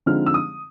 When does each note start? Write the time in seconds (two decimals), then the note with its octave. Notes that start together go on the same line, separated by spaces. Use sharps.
0.06 D3 F3 G#3 C4 D#4 F6
0.26 E6
0.34 D#6